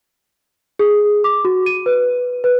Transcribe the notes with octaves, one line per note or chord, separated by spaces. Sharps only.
G#4
D6
F#4
D#7
B4
B4